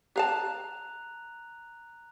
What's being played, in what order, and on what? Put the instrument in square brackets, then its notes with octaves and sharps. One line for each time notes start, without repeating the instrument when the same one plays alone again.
[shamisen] G4 F5 A5 [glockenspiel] A#5 F#6 F7